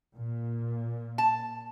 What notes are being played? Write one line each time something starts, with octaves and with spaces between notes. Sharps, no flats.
A#2
A5